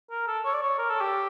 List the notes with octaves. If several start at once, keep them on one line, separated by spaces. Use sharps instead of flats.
A#4
A4
C#5
D5
C#5
A#4
A4
G4